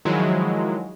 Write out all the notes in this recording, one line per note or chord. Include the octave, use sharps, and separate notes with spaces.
D#3 F3 F#3 G#3 E4